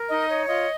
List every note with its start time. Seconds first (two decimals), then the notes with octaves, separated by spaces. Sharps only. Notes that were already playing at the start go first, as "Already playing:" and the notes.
Already playing: A#4
0.09 D#4 D#5
0.30 C#5
0.48 F4 D#5